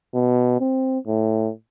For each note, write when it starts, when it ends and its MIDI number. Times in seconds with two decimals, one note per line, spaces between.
0.15 0.58 47
0.60 0.99 60
1.07 1.51 45